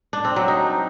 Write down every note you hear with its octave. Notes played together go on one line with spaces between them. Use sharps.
D4
C4
F#3
D#4